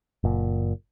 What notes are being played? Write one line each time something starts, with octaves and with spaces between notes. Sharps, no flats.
F#1 A#2